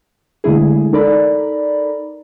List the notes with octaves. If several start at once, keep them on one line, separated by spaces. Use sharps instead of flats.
D3 G#3 A3 E4 G#4
D#4 A4 A#4 D5 A#5 B5